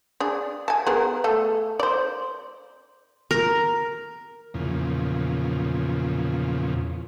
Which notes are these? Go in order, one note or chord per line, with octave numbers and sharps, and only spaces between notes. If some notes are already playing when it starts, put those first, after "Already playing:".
D4 G#4
G#5 A5
B3 G#4 A#4
A3 A4
C5 D5
A#4
E2 A#2 C#3 F3